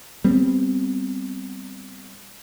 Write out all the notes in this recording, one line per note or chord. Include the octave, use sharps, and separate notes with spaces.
G3 B3 C4